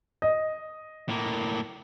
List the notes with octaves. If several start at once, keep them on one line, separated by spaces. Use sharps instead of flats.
D#5
A2 A#3